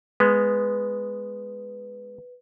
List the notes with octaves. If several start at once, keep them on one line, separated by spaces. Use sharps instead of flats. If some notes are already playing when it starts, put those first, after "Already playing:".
G#3 B3 B4